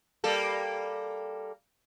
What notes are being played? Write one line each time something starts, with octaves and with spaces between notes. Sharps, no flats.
G3 A#3 A4